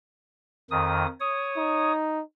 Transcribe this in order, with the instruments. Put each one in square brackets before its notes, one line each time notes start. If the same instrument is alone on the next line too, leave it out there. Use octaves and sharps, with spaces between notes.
[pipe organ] F2 D#3 D#6
C#5 D#6
[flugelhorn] D#4